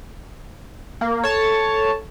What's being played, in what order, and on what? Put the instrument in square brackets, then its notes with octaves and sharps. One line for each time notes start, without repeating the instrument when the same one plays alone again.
[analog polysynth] A#3
[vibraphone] A4 [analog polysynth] C#5 A5